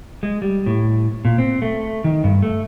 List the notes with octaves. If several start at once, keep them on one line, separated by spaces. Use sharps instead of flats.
G#3
G3
A2
A#2
C4
A3
D#3
G2
A3